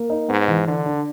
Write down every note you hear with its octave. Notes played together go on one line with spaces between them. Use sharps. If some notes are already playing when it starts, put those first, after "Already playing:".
Already playing: A#3
D#4
G#2 B3
E3
D3 D4
D4